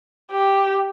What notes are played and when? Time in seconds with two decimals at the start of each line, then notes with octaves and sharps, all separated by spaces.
0.31 G4